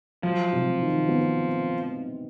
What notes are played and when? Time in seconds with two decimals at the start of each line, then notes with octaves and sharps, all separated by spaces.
0.23 F3 F#3
0.52 C3
0.81 D#3
1.09 B3